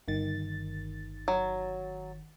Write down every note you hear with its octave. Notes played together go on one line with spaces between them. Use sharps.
G1 D#3 A6
F#3